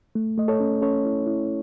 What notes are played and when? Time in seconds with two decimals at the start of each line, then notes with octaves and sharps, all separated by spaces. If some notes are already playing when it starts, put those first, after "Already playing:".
0.15 A3
0.38 A3 D#5
0.48 A4 C#5
0.60 C#4
0.82 C#4 A4 C#5
1.05 E4
1.27 E4